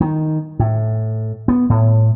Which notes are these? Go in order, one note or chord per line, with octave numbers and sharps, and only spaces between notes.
D#3
A2
B3
A2